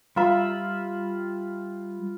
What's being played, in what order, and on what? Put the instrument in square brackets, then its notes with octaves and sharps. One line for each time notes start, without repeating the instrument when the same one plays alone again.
[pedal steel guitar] G3 E5 [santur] F4 B5